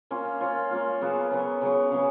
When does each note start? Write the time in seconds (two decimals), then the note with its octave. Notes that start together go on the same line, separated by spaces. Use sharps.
0.11 A#3 C#4 F4
0.41 A#3 C#4 F4
0.71 A#3 C#4 F4
1.01 C#3 F#3 B3
1.31 C#3 F#3 B3
1.61 C#3 F#3 B3
1.92 C#3 F#3 B3